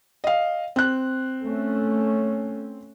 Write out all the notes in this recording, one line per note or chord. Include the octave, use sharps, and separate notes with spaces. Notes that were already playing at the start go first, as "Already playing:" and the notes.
D#5 F5
C4 F#6
A3 C#4